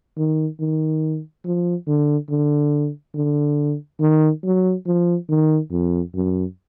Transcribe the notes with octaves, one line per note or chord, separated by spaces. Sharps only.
D#3
D#3
F3
D3
D3
D3
D#3
F#3
F3
D#3
F2
F#2